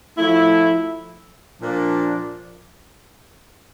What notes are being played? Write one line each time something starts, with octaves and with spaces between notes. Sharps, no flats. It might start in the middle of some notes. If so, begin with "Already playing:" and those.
F3 A3 E4
A#2 F3 A#3 D4